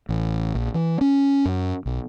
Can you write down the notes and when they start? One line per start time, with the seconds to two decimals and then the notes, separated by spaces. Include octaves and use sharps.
0.09 A1
0.55 A#1
0.74 E3
1.01 C#4
1.45 F#2
1.86 B1